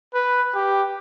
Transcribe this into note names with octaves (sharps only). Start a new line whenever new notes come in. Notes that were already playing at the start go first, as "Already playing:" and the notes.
B4
G4